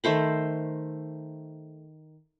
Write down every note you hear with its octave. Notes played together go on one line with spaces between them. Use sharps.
D#3 A3 C5 B5